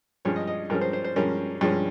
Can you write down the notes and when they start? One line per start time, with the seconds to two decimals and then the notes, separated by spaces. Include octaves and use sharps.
0.25 G2 F3 G#3 C#4 C#5
0.36 D#5
0.47 D#5
0.70 G2 F3 G#3 C#4 A#4
0.81 C5
0.93 C5
1.04 C5
1.16 G2 F3 G#3 C#4 A#4
1.61 G2 F3 G#3 C#4